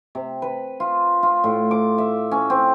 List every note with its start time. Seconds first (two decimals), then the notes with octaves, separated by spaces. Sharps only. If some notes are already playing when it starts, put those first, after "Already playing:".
0.15 C3
0.42 B4
0.80 F4
1.23 F4
1.44 A2
1.71 D6
1.98 E5
2.31 C#4
2.50 C4